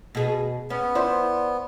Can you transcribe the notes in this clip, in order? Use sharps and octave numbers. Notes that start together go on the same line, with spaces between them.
B2 G#4
B3 C#4
E4 C5 D5